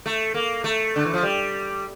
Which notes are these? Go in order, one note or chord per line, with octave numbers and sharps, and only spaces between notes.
A3
A#3
A3
D3
E3
F3
G3